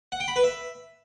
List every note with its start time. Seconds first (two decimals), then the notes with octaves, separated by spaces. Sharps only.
0.12 F#5
0.20 G5
0.28 B5
0.36 B4
0.44 E5